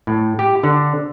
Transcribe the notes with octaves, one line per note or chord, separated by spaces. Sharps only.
A2
G4
D3